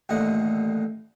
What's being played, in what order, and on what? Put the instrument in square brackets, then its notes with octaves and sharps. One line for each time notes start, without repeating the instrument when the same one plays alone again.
[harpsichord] A1 D#2 A2 D3 D#5 F#5